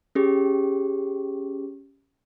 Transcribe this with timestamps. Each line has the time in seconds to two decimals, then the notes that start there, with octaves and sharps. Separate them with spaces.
0.15 C#4 G4 G#4